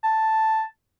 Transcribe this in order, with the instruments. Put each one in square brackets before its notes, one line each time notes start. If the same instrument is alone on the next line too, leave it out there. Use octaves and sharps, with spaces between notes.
[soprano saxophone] A5